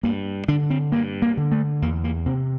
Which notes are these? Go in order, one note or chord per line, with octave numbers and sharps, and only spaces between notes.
G2 A#3
D3 D4
C4
G2 A#3
A#3
D3
A3
E2 A#3
A#3
C3 C4